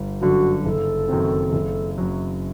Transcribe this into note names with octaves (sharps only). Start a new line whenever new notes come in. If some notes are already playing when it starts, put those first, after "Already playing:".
Already playing: G1
F#2 D3 F#4
F#1 A4
F#2 D#3 F#3 C4
F#1
F#2 F#3